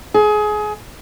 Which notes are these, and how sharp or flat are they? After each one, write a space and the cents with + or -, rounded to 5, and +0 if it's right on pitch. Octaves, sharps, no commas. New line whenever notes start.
G#4 +25